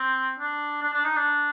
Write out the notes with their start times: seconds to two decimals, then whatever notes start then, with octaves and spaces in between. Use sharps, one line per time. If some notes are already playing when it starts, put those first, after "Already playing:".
Already playing: C4
0.39 D4
0.83 D4
0.93 D4
1.04 D#4
1.16 D4